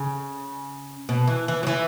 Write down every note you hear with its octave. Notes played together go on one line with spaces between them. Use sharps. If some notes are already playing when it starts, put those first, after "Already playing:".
Already playing: C#3
B2
E3
E3
F#3
E3